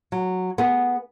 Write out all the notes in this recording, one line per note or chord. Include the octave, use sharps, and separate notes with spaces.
F#3
B3 G#4